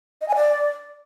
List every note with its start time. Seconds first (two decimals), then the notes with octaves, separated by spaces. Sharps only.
0.21 D#5
0.28 G#5
0.35 D5